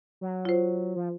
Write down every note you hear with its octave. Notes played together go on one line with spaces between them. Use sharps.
F#3
F4 C5
F3